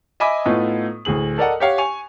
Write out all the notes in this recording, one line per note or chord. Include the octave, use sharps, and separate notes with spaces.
D#5 E5 G#5 B5 D6 D#6
A2 A3 B3 D#4 F4
D2 A2 G#4 F#7
A4 A#4 D5 D#5 F#5
G4 C#5 F5 F#5
G#5 C#6 F7